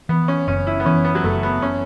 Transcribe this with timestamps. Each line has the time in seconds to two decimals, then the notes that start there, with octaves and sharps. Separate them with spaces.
0.09 E3 B3
0.28 C#4
0.47 F#1 C#4
0.67 E4
0.80 B3
0.85 E3 C#4
1.05 B3
1.15 F#3
1.24 F#1 A3
1.43 B3
1.62 C#4